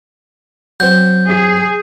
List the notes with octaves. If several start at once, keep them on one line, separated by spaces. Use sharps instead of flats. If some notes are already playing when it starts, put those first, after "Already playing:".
F#3 C4 G6
G#4